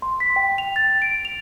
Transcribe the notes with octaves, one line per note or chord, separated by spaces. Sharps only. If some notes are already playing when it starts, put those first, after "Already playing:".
C6
B6
G5
F7
A6
D7
F7